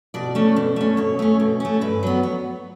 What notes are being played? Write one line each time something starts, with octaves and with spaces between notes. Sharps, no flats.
B2 D5
A3 C#4
B2
A3 C#4
B2 C#5
A3 C#4
B2
A3 C#4
G2 B4
F#3 B3
C#5